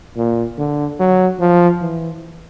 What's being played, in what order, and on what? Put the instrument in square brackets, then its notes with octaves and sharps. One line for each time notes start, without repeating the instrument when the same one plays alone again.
[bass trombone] A#2
D3
F#3
F3
E3